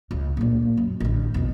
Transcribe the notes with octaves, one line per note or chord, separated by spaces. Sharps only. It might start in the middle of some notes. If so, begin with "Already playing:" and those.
C#2 C#3
A#1 A#3
F#2
A1 D3
B1 F2